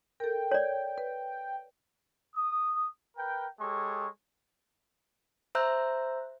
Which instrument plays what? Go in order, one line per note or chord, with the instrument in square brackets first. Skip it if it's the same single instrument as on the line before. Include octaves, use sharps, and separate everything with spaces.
[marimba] A4 A#4 [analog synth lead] G5
[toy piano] C#5 D5
[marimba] B4
[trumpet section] D#6
A#4 B4 G5
G#3 G4 A4 C#5 C#6
[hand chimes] C5 E5 A#5 E6 F#6 G6